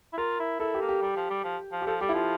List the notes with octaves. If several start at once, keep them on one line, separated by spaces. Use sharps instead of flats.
E4
F4 A#4
E4
E4 A4
G4
A#3
G4
G3
F3
G3
F3
F3
G4
F3 A4
G3 G4
E4
F3 F4